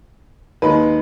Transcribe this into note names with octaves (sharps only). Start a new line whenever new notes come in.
D#2 D#3 G#3 B4